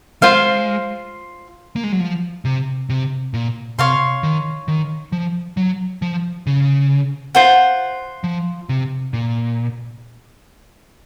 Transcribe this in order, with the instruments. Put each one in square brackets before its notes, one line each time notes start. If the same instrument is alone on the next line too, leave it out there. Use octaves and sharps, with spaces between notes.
[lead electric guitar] G#3 [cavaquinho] F4 C5 F5
[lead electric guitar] A#3
G#3
F#3
F3
C3
C3
A#2
[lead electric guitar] C3 [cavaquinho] C#5 F5 C6
[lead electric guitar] D#3
D#3
F3
F#3
F3
C#3
[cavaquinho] F4 C5 F#5
[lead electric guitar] F3
C3
A#2